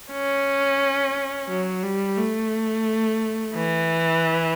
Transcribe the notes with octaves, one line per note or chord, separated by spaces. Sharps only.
C#4
F#3
G3
A3
E3